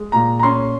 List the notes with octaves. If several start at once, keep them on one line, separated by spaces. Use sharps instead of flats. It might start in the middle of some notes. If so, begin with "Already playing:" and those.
Already playing: G#3
A#2 A#5
A#5
C#4 C6